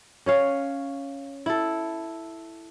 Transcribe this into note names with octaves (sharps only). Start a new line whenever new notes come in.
C#4 C#5 F5
E4 A4